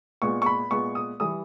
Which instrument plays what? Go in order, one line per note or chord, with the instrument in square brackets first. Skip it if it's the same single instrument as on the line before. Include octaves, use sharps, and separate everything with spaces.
[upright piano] A#2 G#3 B3 C#6
C#6
B5
A#2 G#3 B3 C#6
D#6
E3 G3 D#6